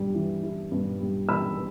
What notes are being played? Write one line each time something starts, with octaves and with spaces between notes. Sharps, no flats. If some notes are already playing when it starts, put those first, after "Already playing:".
Already playing: G2 G3
E3
E4
G2
G3
E3 B5 E6